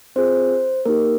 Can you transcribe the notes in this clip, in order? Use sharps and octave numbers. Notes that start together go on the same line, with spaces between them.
C4 F4 G#4 C5
A#3 D#4 G4 A#4